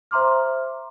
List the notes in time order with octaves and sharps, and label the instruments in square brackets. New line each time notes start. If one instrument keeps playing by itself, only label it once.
[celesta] C5 E5 A#5 C6 D6 F6